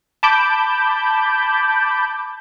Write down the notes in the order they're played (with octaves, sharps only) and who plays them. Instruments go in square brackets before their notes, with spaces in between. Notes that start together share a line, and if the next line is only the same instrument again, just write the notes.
[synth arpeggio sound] A5 B5 D6 G6